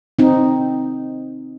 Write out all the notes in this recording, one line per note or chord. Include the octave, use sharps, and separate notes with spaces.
C4 D#4